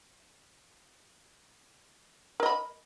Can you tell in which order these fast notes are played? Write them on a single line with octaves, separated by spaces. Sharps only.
A#4 D#5 B5